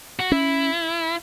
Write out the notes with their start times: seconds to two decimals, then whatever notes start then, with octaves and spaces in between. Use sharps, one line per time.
0.19 F#4
0.31 C#4 E4